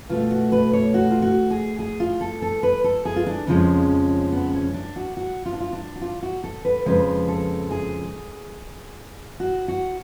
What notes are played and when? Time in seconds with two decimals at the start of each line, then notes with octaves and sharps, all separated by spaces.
0.09 B2 A3 F4
0.31 F#4
0.52 B4
0.73 C#5
0.94 F#4
1.11 F4
1.22 F#4
1.51 G#4
1.79 G#4
2.00 F4
2.21 A4
2.42 A4
2.63 B4
2.84 A4
3.05 G#4
3.16 F4
3.26 D4
3.47 F2 C#3 F3 G#3 C#4
4.32 B3
4.53 C#4
4.74 D4
4.96 F#4
5.17 F#4
5.46 F4
5.53 D4
5.60 F4
5.73 D4
5.96 F#4
6.01 F4
6.23 F#4
6.44 A4
6.65 B4
6.86 F2 C#3 F3 G#3 B4
7.28 A4
7.71 G#4
9.40 F#4
9.68 F#4